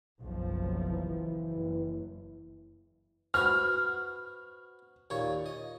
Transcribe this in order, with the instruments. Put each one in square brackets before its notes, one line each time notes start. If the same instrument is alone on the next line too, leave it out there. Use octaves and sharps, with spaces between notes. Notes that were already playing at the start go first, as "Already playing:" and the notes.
[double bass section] F#1 B1 F3
[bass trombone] E3
[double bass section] F#1
[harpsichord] F#4 B4 C5 [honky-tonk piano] F6
[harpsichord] D#2 A#2 C#5
D#5